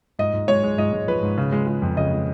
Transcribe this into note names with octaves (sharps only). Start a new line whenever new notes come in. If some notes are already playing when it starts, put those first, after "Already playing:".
G#2 D#5
G#2
G#3 C#5
G#3
G#2 D#5
G#3
F3 B4
G#2
C#3
G#3
G#3
F2
C#3 D#5
G#3